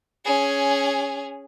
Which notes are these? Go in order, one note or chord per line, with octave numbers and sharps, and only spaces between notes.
C#4 G#4